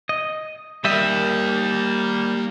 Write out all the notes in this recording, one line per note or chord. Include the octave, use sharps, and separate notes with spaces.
D#5
G3 A#3 D#5 E5